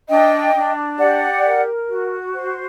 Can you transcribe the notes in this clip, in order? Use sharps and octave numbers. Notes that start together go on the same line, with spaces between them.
D4 D#5 G5
D4
G4 D5 F#5
A#4
F#4
C5